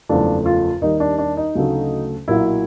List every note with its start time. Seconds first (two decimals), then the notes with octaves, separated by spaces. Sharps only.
0.09 F#1 E2 C#3 F3 A3 D4
0.46 F4
0.82 D#2 D#3 G3 D#4
1.00 D4
1.19 D4
1.37 D#4
1.55 D2 C#3 F#3 A3
2.28 B1 A#2 F#3 E4